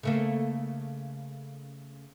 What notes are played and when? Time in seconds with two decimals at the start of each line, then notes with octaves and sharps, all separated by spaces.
0.03 C#3 A3 A#3